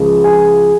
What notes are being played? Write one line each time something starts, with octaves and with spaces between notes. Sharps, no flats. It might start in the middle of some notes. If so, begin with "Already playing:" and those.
Already playing: C#2 C#3 F3 G#3
G#4 G#5